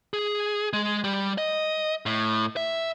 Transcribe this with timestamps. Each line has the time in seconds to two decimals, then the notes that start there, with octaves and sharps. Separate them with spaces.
0.14 G#4
0.73 G#3
1.04 G3
1.38 D#5
2.06 A2
2.57 E5